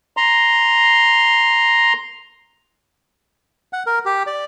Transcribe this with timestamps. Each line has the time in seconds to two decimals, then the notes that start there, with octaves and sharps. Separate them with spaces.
0.17 A#5 C6
3.73 F#5
3.86 A#4
4.06 G4
4.27 D5